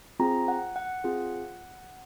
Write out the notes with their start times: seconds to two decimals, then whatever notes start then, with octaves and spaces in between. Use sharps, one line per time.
0.20 C4 F4 G#4 A#5
0.48 F#5
0.76 F#5
1.04 C4 F4 G#4